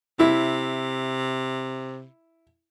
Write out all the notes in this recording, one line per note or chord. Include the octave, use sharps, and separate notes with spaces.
C3 E4